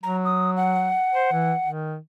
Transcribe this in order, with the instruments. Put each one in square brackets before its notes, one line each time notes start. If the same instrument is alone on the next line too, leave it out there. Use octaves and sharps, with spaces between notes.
[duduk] F#3 [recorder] A#5
[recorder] D#6
F#5
[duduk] C5
E3
D#3